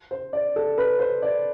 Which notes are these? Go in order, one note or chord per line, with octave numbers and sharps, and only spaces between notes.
C5
D5
A4
B4
C5
D5